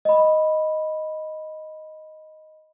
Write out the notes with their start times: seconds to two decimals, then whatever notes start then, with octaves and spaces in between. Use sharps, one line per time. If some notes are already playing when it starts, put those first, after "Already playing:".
0.05 D#5 B5